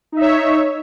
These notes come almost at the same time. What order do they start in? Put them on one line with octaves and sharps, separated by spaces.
D#4 E5 C#5